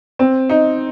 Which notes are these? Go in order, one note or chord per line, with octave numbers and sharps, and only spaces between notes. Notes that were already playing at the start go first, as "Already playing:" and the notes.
C4
D#4